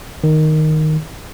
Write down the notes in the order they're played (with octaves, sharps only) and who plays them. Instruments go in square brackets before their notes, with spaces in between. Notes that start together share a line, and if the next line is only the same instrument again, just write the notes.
[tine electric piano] D#3